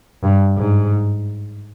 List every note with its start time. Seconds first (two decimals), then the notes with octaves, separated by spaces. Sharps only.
0.24 G2
0.58 G#2